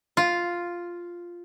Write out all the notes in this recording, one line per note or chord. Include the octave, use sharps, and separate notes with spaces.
F4